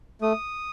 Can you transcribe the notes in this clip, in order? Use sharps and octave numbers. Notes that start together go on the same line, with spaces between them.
A3 D#6